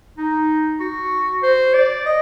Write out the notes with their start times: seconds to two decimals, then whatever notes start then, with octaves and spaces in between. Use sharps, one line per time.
0.18 D#4
0.80 F#4
1.43 C5
1.74 D5
2.06 D#5